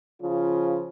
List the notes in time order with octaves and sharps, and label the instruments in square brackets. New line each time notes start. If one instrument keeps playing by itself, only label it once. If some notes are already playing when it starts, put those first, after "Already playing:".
[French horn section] C#3 F3 F4